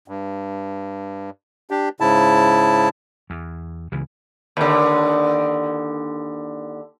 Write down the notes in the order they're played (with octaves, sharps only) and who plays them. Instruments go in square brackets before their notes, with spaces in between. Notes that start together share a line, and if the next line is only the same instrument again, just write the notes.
[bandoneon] G2
D4 G4
G#2 C#3 E4 A5
[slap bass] E2
C#2 C#3 E3
[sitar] D#2 D3